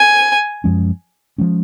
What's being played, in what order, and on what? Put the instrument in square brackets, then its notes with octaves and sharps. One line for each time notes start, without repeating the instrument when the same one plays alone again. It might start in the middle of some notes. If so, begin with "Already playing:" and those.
Already playing: [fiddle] G#5
[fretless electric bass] F#2 F3 G#3 C#4
F3 G#3 C#4